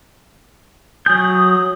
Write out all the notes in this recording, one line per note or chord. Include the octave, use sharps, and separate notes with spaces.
F#3 G#5 D#6 G6